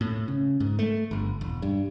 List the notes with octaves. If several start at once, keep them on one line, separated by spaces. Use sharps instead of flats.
A2
C#3
G#2
A3
G1
E1
G2